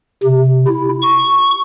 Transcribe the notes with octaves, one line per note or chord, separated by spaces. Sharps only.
C3
E4
C#6